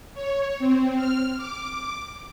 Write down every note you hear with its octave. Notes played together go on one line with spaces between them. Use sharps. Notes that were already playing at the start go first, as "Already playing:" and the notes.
C#5
C4
F6
D6